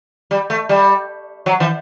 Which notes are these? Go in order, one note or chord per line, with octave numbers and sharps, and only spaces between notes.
G3
A3
G3
F#3
E3